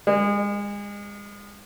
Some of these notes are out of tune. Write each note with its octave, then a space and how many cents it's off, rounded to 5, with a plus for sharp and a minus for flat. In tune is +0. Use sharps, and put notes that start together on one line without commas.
G#3 -30